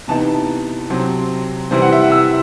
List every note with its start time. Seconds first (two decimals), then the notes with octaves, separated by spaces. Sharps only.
0.08 C3 E3 B3 D#4 A5
0.90 C3 F#3 C4 C5
1.71 C3 E3 G3 C4 E4 C5
1.82 F#5
1.92 E5
2.01 F#5
2.12 E6